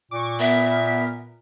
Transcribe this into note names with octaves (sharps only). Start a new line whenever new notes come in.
A#2 C#6 D6
B3 A#4 E5